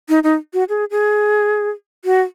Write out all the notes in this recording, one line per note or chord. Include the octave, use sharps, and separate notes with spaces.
D#4
D#4
F#4
G#4
G#4
F#4